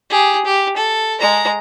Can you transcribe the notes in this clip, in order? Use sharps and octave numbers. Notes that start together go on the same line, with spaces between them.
G4 G#4
G4
A4
G#3 A#5